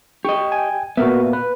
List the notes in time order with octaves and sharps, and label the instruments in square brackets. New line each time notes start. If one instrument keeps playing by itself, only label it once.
[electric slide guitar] G4 D#5 [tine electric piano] C#6
[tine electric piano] G5 G#5
[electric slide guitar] A#2 B3 [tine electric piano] F#4 A#4 E5
[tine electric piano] B4